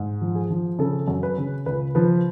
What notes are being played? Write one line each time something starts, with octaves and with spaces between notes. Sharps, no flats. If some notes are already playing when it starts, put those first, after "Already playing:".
Already playing: G#2
F3
G#4
F3
C#3 A4
F#2
B4
C#3
C#2 B4
F3 B4